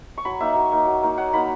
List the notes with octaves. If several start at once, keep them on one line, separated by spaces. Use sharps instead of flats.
C#6
F#3 B5
A#3 D#4 E5
F#3
A#3 D#4
F#3
A#3 D#4
F#3 F#5
A#3 D#4 B5